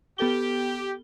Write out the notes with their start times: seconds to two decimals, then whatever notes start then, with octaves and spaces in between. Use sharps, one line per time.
0.18 B3 G4 A4 G7